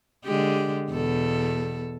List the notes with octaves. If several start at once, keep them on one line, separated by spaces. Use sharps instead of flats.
D3 G#3 G4
E2 B2 A4